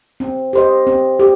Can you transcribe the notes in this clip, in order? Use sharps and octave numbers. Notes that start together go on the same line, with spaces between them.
C4
G4 C5 D#5
C4
G4